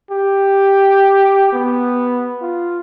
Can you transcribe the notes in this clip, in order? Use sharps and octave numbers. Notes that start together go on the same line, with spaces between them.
G4
B3
F4